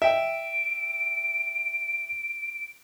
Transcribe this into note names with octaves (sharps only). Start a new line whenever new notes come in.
E5 G5 D7